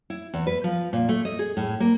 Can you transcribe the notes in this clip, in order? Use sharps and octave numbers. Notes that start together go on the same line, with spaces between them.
E4
E2
B4
F3
A#2
A3
D#5
G#4
A2
A#3